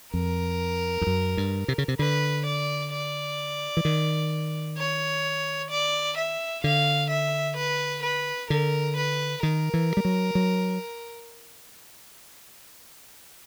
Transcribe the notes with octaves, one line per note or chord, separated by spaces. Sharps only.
F2 A#4
F2
F#2
G2
C3
C#3
C3
D3 B4
D5
D5
E3
D#3
C#5
D5
E5
D3 F5
E5
B4
B4
D3 A#4
B4
D#3 A#4
E3
G3
F#3
F#3